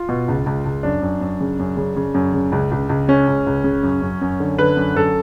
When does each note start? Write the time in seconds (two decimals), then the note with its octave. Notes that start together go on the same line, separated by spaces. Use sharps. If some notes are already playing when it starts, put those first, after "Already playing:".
Already playing: F4
0.09 B2
0.28 C#2
0.46 C#2
0.65 C#2
0.83 F#2 D4
1.02 F#2
1.21 F#2
1.41 C#3
1.59 F#2
1.77 C#3
1.96 C#3
2.14 F#2
2.33 C#3
2.52 C#2
2.71 C#2
2.89 C#2
3.08 C#3 C#4
3.28 C#2
3.46 C#2
3.64 C#3
3.83 F#2
4.02 F#2
4.21 F#2
4.40 D3
4.59 D3 B4
4.77 F#2
4.95 F#2 A4